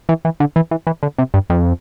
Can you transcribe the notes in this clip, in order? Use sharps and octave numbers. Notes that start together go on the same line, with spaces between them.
E3
E3
D3
E3
E3
E3
D3
C3
G2
F2